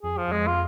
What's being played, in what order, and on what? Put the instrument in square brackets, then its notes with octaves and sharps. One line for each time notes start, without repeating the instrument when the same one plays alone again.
[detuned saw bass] F2 [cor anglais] G#4
[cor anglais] F3
[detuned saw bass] F2 [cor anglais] G#3
[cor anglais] F4